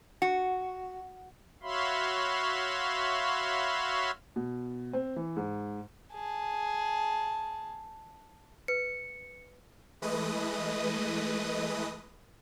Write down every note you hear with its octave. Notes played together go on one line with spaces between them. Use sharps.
F#4
F#4 C#5 E5 F5 B5 C6
B2
C4
E3
G#2
G#4 A5
B4 C#7
E3 G#3 A3 B4 D#5 D#6